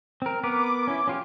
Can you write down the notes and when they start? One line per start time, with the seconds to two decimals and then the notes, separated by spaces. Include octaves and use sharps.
0.22 C4 A#4
0.43 B3 A#4 B4 D6
0.87 C#4 E4
1.07 C#4 F4 G4